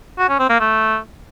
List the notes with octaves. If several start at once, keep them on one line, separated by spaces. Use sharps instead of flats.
F#4
C#4
C4
A#3
A3